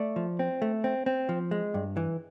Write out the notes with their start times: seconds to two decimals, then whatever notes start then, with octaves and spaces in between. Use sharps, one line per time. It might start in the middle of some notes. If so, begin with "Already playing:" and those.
Already playing: A3 D5
0.16 F3
0.39 C4
0.62 A3
0.84 C4
1.06 C4
1.29 F3
1.51 G#3
1.74 G2
1.97 E3